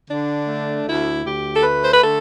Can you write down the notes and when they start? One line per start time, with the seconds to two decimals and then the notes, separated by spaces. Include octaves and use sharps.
0.08 D3 D4
0.47 A3
0.86 D2 E4
1.25 D2 G4
1.54 A4
1.63 A3 B4
1.82 C5
1.92 B4
2.02 D3 A4